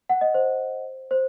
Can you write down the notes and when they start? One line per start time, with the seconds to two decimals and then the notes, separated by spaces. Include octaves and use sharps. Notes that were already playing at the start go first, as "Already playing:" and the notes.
0.09 F#5
0.21 D#5
0.34 C5
1.11 C5